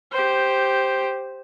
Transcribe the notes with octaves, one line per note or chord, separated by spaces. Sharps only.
G4 C5